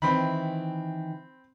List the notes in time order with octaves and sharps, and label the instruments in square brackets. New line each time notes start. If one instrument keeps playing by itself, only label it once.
[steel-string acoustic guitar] D#3 E3 E4 [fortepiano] C4 B5